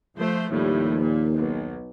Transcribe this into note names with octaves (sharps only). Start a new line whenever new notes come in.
F3 A3 C5
D#2 A2 F3 G3
A#2
B1